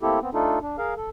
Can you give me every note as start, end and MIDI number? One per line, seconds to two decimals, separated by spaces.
0.02 0.19 57
0.02 0.19 58
0.02 0.19 60
0.02 0.19 64
0.02 0.19 67
0.02 0.19 69
0.22 0.30 59
0.22 0.30 60
0.34 0.59 57
0.34 0.59 62
0.34 0.59 63
0.34 0.59 65
0.34 0.59 69
0.62 0.77 62
0.78 0.94 68
0.78 0.94 70
0.78 0.94 77
0.97 1.10 69